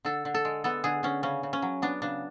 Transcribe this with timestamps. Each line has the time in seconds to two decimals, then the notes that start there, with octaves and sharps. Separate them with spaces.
0.05 D3 A4
0.25 D3
0.34 A4
0.45 G#3
0.64 B3 A4
0.84 D3 G#4
1.03 D3 C#4
1.23 C#3 C#4
1.43 C#3
1.53 C#4
1.62 F#3
1.82 B3 D4
2.02 C#3 D4